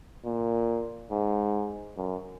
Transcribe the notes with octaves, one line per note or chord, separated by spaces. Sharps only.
A#2
G#2
F#2